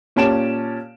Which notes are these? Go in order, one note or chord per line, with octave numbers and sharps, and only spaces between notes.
A#2 C#4 G4 A5 D7 E7